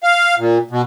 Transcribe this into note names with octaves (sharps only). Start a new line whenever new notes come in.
F5
A#2
B2